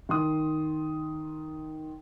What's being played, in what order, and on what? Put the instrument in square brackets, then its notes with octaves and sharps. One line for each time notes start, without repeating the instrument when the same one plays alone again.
[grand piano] D#3 C6 D#6